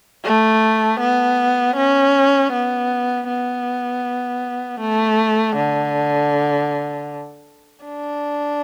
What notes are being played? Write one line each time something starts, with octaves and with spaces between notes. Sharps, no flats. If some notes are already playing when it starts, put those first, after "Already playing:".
A3
B3
C#4
B3
B3
A3
D3
D4